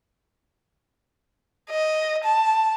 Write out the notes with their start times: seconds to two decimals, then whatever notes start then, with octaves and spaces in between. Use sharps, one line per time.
1.70 D#5
2.24 A5